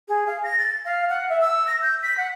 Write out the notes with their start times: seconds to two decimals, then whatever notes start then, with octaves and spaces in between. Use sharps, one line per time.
0.08 G#4
0.27 F5
0.43 A#6
0.58 A6
0.85 F5
1.09 F#5
1.29 E5
1.41 E6
1.67 A#6
1.82 G6
2.02 B6
2.17 F#5